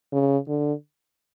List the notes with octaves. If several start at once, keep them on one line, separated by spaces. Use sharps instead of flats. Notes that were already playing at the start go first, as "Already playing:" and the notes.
C#3
D3